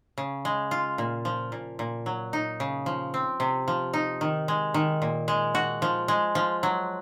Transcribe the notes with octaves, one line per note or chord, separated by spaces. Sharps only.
C#3
G#3
F4
A#2
F3
A#2
A#2
F#3
D#4
C#3
F3
C4
C3
F3
D#4
D#3
G#3
D#3
A#2
G#3
F#4
F3
G#3
F3
F#3